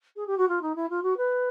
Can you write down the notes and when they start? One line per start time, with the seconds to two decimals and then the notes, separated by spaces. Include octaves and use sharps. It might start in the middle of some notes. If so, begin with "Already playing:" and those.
0.16 G#4
0.26 G4
0.37 F#4
0.48 F4
0.61 D#4
0.75 E4
0.89 F4
1.02 F#4
1.17 B4